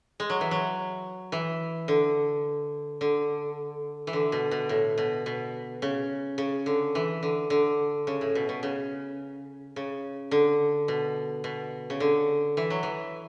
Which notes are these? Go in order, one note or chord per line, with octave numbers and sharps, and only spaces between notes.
G#3
F#3
E3
F#3
E3
D3
D3
E3
D3
B2
B2
A2
B2
B2
C#3
C#3
D3
E3
D3
D3
C#3
A2
B2
B2
C#3
C#3
D3
B2
B2
C#3
D3
E3
F#3
E3